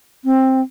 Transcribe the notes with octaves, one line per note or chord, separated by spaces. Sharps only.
C4